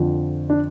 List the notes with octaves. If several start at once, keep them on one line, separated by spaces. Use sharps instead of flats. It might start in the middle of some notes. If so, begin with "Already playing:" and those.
Already playing: F2 D3 F3
D4